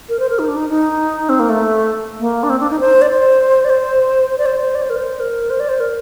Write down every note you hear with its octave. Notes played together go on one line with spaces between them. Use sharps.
A#4
C5
A#4
D#4
D4
D#4
D#4
C4
A#3
A3
A#3
D4
C4
D4
D#4
C5
D5
C5
D5
C5
C5
D5
C5
C5
D5
C5
A#4
C5
A#4
C5
D5
C5
A#4